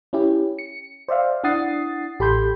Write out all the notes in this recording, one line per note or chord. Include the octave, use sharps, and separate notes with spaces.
C#4 E4 G4
C#7
C5 D5 E5 F5
D4 E4 F#5 D#6 A6 C7
A1 G4 A4 B5 C6 G6